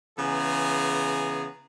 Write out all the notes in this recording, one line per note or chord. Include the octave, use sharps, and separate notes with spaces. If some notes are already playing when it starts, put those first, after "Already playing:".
C#3 E3 B3 G#4 A#5